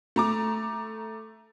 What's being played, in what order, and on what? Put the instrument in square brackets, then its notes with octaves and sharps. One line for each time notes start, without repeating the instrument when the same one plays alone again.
[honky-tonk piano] A3 A#5 D6